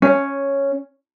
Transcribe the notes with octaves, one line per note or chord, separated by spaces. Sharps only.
C#4